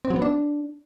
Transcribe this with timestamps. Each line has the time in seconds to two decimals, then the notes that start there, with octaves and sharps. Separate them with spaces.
0.05 C4
0.10 F#3
0.16 B3
0.22 D4